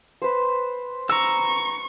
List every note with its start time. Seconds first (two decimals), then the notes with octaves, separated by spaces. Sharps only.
0.22 B4 C5
1.10 A#5 C#6 E6